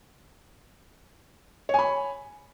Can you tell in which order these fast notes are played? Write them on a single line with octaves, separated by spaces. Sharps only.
C#5 G#5 B5